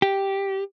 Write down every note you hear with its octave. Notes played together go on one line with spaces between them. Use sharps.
G4